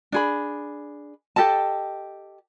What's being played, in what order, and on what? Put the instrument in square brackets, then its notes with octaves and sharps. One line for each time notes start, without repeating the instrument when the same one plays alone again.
[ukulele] D4 G#4 B5
G4 A4 D#5 A5